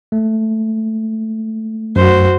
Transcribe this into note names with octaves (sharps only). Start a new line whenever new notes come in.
A3
F#2 F#4 C5